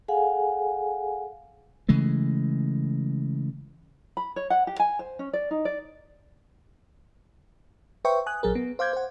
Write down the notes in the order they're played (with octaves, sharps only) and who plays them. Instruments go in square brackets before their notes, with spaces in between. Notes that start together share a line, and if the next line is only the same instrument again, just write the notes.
[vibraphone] G#4 A4 F5 F#5 G#5
[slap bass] C#3 E3 G#3 A3
[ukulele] B5
C#5
F#5
G4
G#5
C5
C#4
D5
D#4
D5
[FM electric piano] B4 C5 E5 G5 C#6
G#5 D#6 F#6
A#1 F#3 G#4 A#4
B3
C5 F5 D6 G6 G#6
C5 F#5